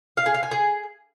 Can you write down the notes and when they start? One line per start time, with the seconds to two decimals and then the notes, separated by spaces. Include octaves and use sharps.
0.17 F5
0.26 G#4
0.34 F5
0.43 G#5
0.51 G#4